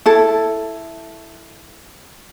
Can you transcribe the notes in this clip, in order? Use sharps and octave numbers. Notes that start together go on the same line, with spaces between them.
E4 A4